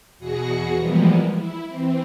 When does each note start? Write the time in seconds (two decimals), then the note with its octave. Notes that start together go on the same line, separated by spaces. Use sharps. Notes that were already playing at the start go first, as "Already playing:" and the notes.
0.19 E2 B2 F#4 G#4 A#6 C#7
0.75 E3 F3 G3 G#3 A#3 B3
1.34 E4
1.66 E3 C4